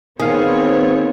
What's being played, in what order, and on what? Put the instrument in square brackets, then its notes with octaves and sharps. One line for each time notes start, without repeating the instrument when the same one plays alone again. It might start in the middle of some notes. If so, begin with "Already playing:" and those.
[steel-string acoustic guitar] D#3 [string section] B3 C4 C#5 [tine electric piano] G#4 F5